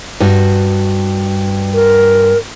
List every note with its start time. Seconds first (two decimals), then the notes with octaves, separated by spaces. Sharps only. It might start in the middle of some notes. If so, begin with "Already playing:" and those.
0.20 G2 F#4
1.73 A#4